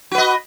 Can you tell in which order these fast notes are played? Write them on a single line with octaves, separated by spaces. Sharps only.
F#4 B4 D#5